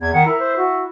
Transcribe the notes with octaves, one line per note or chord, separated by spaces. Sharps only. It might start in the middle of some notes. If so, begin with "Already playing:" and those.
E2 G#6
D#3 F#5
E4 A#4
C5
F#4